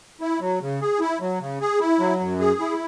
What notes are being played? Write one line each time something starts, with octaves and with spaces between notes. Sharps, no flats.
E4
F#3
C#3
G#4
E4
F#3
C#3
G#4
E4
F#3
F#2
G#4
E4